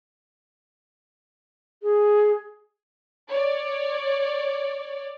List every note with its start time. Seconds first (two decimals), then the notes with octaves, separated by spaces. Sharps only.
1.83 G#4
3.29 C#5 D5